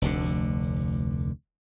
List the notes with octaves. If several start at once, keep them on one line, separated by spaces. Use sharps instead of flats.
F1 D2 D3